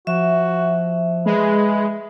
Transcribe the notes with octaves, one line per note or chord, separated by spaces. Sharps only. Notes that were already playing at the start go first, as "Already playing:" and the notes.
F3 F#4 E5
G#3 B4